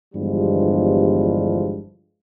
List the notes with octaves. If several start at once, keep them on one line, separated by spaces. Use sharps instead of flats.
G1 E2 G2 F3 G3 G#3